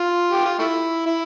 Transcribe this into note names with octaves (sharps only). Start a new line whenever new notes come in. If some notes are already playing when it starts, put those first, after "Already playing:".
Already playing: F4
G4
F4
A3 E4
E4